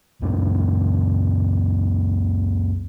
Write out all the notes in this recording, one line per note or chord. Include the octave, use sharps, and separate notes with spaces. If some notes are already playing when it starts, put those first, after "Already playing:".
C#2 F#2 D4